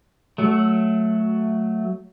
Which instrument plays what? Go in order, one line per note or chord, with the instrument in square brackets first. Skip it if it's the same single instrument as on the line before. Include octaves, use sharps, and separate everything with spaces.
[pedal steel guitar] F#3 A3